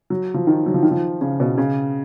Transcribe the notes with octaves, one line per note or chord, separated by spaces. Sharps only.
F#3
F3
D#3
F#3
F3
D#3
F3
C#3
B2
C#3